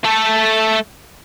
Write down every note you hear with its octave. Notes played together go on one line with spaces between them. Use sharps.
A3 A4